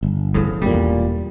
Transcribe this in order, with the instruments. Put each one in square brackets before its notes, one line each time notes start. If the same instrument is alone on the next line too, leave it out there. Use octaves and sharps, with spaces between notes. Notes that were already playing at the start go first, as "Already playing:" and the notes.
[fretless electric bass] G1
[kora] A2 C#3 [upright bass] F3 B3
[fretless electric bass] E1 A#2 [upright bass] F#2 [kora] G3
[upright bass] E2